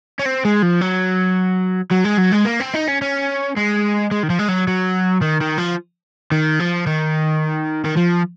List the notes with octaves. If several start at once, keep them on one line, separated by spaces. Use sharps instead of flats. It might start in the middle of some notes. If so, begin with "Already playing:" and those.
C#4
C4
G#3
F3
F#3
F#3
G#3
F#3
G#3
A#3
C4
D#4
C#4
C#4
G#3
G#3
D#3
F3
G#3
F#3
F#3
D#3
D#3
F3
D#3
F3
D#3
D#3
F3